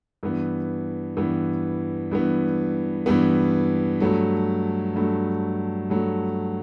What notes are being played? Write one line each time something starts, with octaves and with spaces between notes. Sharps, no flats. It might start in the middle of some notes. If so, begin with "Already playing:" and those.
G2 E3 B3
G2 E3 B3
G2 E3 B3
G2 E3 B3
G2 F#3 A3
G2 F#3 A3
G2 F#3 A3